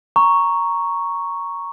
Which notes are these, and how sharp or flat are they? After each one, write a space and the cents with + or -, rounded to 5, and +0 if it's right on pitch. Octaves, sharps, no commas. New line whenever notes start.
A#5 +0 C#6 +0